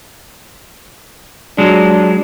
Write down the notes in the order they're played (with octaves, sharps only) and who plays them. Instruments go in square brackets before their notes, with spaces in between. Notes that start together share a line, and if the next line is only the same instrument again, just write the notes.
[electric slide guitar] F#3 G#3 [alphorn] D4